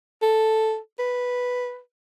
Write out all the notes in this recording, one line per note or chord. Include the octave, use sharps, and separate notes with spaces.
A4
B4